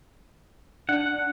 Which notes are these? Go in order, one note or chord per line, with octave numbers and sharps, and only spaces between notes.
D4 F#5